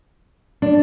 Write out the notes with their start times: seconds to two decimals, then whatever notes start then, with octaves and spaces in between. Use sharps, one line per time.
0.62 D4